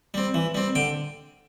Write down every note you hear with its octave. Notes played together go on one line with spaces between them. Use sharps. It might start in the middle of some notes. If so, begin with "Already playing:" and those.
G3 C4
E3
G3 C4
D3 G5